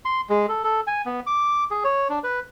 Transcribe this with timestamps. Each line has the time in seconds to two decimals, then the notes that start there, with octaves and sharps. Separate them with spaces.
0.05 C6
0.30 G#3
0.49 A4
0.64 A4
0.87 G#5
1.06 B3
1.27 D6
1.71 G#4
1.84 C#5
2.10 D4
2.24 B4